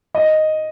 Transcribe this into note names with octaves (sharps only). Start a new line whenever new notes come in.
D#5